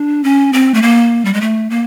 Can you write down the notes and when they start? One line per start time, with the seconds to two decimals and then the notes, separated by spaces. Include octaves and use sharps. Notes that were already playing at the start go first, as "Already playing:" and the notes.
Already playing: D4
0.24 C#4
0.53 C4
0.74 A3
0.82 A#3
1.25 G3
1.34 G#3
1.41 A3
1.70 A#3